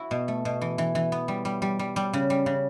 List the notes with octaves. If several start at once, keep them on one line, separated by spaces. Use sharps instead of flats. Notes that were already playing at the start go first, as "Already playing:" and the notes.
Already playing: E4 F#4
B2
A3
B2
E3
E3
E3
B3
G3
G3
G3
G3
G3
C#3
G3
C#3